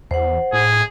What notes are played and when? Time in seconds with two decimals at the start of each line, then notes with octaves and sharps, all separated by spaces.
0.11 E2 C5 F#5
0.53 A2 G#4